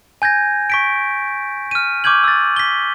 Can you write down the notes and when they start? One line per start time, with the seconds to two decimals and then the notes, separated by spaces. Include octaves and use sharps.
0.22 G#5 G6 G#6 A#6
0.70 C#6 B6 D7
1.71 F6 D#7
2.04 C#6 D6 F6 G6 G#6 F#7
2.24 E6 A6
2.56 B6 G7